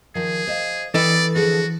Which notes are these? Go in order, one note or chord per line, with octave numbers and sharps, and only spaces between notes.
D#3 F3 G#4
C5 D#5 F5
E3 C4 A4 B4 D5 D#5
D3 F3 F#4 G#4